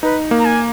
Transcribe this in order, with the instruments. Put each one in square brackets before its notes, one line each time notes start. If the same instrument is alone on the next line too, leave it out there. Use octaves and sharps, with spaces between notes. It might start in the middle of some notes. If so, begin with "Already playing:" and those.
[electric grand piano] D#4 [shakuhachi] B4
[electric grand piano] A#3
[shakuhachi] A#5
G#5